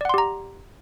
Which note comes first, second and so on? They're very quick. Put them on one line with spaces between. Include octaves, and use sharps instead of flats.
D5 F#5 C6 G4 A#5